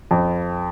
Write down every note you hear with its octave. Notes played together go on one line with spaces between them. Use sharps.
F2